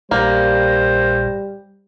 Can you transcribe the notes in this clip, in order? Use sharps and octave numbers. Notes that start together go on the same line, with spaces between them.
A#1 A#2 G3 A#3 C5